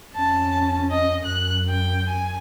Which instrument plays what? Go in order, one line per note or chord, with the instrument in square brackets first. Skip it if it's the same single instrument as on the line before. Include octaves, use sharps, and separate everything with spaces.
[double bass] F2 C#4 [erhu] A5
[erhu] D#5
[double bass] F#2 [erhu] F#6
[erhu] G5
G#5